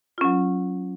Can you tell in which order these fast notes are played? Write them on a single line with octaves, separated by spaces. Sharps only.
F4 C#4 F#3